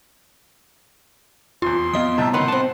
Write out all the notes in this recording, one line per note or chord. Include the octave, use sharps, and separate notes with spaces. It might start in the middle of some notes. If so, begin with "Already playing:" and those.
F1 E2 F4 C6
F2 B3 F4 D#5 D#6
A2 C3 G3 D#4 E5 A5
C#2 D#3 B4 F#5 C6 F#6
C4 A5